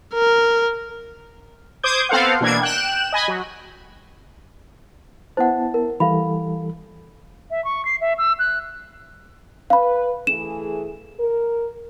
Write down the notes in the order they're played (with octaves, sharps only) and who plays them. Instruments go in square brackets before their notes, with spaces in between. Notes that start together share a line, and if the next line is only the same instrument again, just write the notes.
[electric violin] A#4
[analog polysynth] C5 D6 D#6 G6 G#6
B3 C4 A4 C5 F5 F#5
B2 E3 A#3 D4 G#6
G5 F#6 E7
D#5 G#5 B5
F#3
[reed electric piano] B3 E4 A5 [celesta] C5 F#5
[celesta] A#4
[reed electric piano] E3 G3 A4 [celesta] F5 B5
[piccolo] E5
C#6
C7
E5
E6
F#6
[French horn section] B4 [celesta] F5 B5
[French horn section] E3 A3 G#4 [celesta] E7
[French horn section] A#4